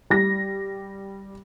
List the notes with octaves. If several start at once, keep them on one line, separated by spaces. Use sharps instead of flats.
G3 A#6